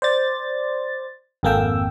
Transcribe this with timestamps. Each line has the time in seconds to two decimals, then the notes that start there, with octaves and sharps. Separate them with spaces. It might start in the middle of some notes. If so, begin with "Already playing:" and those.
0.02 C5 D5 A6
1.43 G#1 F2 A#3 A4 G5 E6